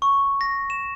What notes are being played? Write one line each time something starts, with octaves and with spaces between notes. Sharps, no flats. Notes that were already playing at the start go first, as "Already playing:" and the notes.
C#6
A#6
E7